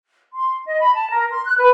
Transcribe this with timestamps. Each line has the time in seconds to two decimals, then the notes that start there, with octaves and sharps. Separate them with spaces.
0.32 C6
0.66 D#5
0.81 B5
0.94 A5
1.09 A#4
1.31 C6
1.46 F#6
1.58 B4